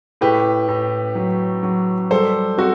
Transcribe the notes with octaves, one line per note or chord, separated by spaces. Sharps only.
A2 G4 B4
A2
F#3
F#3
G3 A4 C5
C4 F#4 A4